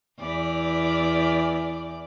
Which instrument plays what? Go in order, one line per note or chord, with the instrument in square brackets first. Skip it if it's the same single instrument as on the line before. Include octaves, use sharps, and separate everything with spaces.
[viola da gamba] E2 E3 D5